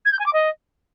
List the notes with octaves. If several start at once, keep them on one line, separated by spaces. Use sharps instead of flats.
G#6
G6
G#5
D6
D#5